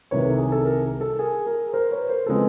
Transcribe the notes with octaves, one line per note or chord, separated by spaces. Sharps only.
C2 C3 D#3 B4 C#5
A4
G#4
A4
G#4 A#4
A4
G#4 A#4
G#4 A#4
A#4 C5
B4 C#5
A#4 C5
C#3 F3 G#3 C4 A4 B4